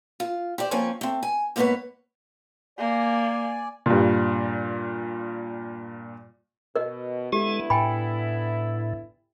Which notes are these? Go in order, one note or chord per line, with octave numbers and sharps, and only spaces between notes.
F4
G4 C5 D5
F3 A#3 C4 C#4 C#5 G#5
A3 C4
G#5
G#2 A#3 B3 G4 B4 C#5
A#3 D5 G#5
G2 A#2
B2 A#4 D#5
D3 G#3 B3 E4 G4 A4
A2 G5 G#5 B5